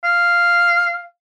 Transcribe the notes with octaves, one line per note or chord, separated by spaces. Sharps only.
F5